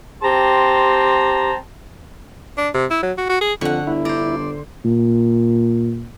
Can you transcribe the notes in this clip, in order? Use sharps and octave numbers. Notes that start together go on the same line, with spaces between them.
C4 G4 A5 A#5 C6
D4
C3
E4
F#3
F#4
F#4
G#4
F2 D3 F#5 C#6
G1 E4
C5 D5 A#5
A#2